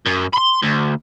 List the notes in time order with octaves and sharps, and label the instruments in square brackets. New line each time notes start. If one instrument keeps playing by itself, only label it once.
[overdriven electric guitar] F#2
B5 C6
D2